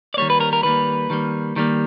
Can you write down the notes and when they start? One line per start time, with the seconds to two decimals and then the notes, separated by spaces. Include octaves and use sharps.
0.14 D5
0.17 D#3 G3 A#3 C#5
0.30 B4
0.40 A#4
0.53 A#4
0.63 D#3 G3 A#3 B4
1.10 D#3 G3 A#3
1.56 D#3 G3 A#3